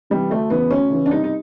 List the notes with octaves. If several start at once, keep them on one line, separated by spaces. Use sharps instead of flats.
C3 E3 G3
D2 A3
C#3 E3 B3
D2 C#4
C#3 E3
D4
C2 D#4
D#4